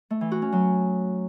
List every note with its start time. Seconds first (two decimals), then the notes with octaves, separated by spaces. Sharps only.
0.10 A3
0.21 E3
0.31 F#4
0.42 C#4
0.53 F#3